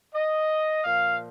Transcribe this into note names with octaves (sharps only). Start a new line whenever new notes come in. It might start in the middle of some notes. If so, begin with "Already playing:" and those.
D#5
A#2 F3 F5